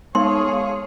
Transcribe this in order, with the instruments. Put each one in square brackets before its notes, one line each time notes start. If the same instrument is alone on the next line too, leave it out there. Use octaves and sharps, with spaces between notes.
[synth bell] G#3 B3 D#4 [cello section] G#4 C#5 [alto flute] F5 [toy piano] C6